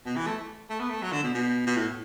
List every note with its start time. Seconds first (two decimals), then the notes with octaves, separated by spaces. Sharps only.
0.06 B2
0.16 E3
0.27 A3
0.70 A3
0.80 B3
0.90 A3
1.02 F#3
1.13 D3
1.23 B2
1.34 B2
1.66 B2
1.77 A2